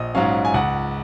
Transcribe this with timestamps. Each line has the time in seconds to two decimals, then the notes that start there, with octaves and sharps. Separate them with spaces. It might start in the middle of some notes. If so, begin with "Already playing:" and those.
Already playing: A#1 D#5
0.15 G#2 F#3 C#4 F5
0.45 G#5
0.54 C#2 F#5